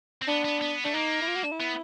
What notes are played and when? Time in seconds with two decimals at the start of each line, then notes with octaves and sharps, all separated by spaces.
0.22 C4
0.28 B3 D4
0.45 B3
0.61 B3
0.84 A3 D4
0.94 A#3 D#4
1.22 E4
1.27 F4
1.36 F#4
1.44 D4
1.52 E4
1.60 B3